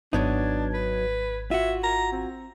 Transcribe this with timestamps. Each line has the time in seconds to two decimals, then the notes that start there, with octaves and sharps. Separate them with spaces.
0.13 G#1 F#3 B3 D4 D#4 G#6
0.74 B4
1.51 F4 F#4 E5
1.83 A#5
2.12 C4